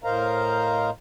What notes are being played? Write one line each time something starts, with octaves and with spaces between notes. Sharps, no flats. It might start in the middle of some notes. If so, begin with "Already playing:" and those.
A2 A#4 C5 D#5 F5 A#5